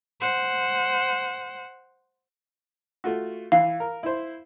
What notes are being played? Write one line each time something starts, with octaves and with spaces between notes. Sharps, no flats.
C5 F#5
A3 F4 F#4
E3 F5
A#4
E4 C5